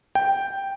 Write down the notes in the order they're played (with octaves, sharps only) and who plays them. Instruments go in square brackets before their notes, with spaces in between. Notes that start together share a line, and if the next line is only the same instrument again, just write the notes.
[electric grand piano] G5